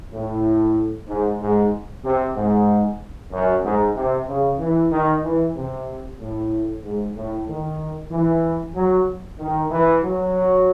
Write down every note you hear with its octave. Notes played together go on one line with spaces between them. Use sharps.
A2
G#2
G#2
C3
G#2
F#2
G#2
C3
C#3
E3
D#3
E3
C3
A2
G#2
A2
D#3
E3
F#3
D#3
E3
F#3